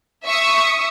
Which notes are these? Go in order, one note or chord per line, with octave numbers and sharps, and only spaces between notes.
E5 C#6 D#6